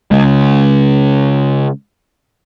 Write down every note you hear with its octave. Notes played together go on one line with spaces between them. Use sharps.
C#3 G#3